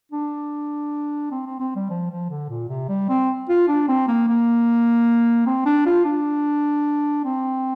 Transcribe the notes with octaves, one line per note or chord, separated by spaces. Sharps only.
D4
C4
C4
C4
G3
F3
F3
D3
A#2
C3
G3
C4
F4
D4
C4
A#3
A#3
C4
D4
F4
D4
C4